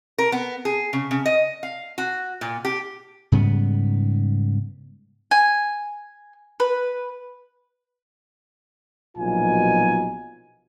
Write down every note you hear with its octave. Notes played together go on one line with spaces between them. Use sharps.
A#4
B3
G#4
C#3
C#3
D#5
F5
F#4
A#2
G4
G#2 C#3 G3 B3
G#5
B4
A#1 B2 F#3 D#4 F4 G#5